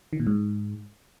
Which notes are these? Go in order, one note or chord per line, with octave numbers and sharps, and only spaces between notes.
D#3
A#2
G#2